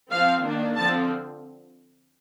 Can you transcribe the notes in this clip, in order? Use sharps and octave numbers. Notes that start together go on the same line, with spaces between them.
F3 C4 F5
D#3 A#3 D4
D3 F3 C4 A5